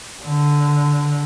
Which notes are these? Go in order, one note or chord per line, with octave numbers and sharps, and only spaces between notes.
D3